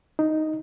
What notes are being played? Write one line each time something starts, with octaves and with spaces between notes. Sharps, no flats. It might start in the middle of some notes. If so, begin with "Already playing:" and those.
D#4